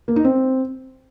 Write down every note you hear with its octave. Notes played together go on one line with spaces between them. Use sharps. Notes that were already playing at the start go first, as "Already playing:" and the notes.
A#3
D#4
C4